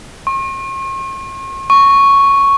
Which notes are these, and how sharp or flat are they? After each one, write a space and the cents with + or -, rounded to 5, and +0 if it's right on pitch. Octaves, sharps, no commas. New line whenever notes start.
C#6 -45
C#6 +0